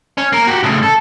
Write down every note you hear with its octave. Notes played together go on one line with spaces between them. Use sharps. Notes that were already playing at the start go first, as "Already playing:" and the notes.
C#4
A#3 A#4
F#4 G4
A2 C#3
A4